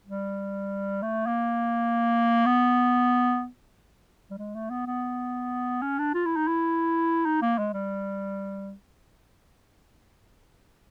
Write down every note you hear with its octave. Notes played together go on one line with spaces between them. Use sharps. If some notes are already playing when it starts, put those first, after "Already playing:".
G3
A3
A#3
B3
G3
G#3
A3
B3
B3
C#4
D4
F4
E4
D#4
E4
D#4
A#3
G#3
G3